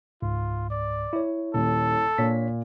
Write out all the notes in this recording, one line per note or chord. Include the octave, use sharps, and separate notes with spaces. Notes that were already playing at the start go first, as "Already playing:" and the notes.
C#2 G#2 F4
D5
E4 C#5
D#1 A4
A#2 D4 C#5 B6